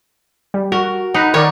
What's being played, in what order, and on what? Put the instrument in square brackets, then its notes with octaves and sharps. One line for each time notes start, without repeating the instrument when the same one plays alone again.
[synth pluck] G3
[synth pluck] F#4 [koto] A#4
[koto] D#4 [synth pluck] F#5 A#5 B5
[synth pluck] D#3 A#4 D5 [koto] C#5